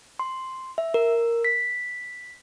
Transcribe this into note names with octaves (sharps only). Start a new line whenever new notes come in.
C6
E5
A#4
B6